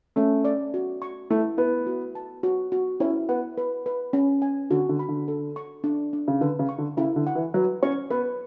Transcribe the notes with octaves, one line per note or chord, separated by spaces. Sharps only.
A3 C#4
D5
F#4
C#6
A3 E4
B3 E4
F#4
A5
F#4
F#4
C#4 E4
B3 F#5
B4
B4
C#4
G#5
D3 F#4
D3
B5
D3
A4
C#6
D4
D4
C#3
D3 B4
C#3
C#6
D3
C#3 E4
D3
F#5
E3
F#3 B4
C#4 C#6
B3 B4